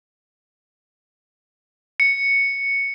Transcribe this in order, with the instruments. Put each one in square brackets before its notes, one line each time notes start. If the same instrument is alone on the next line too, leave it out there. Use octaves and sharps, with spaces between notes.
[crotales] C#7